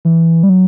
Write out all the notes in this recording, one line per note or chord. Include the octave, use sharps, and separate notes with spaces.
E3
G3
F#3